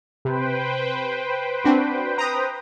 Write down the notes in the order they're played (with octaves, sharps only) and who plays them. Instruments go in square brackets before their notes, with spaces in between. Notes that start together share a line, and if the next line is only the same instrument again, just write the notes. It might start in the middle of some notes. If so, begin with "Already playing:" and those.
[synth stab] C3 [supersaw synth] B4 C5 G5
[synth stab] C4 D4 F#4
A#5 D#6